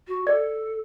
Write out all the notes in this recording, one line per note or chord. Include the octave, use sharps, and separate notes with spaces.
F#4
A4 D5 G#6